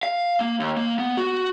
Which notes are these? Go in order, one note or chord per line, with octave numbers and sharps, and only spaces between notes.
F5
A#3
D#2
A#3
B3
F#4